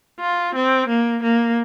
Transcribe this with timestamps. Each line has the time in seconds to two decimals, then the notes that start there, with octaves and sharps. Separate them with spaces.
0.21 F4
0.55 C4
0.88 A#3
1.23 A#3